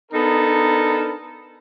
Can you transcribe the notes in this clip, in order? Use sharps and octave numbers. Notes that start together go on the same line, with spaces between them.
B3 D4 D#4 A4 A#4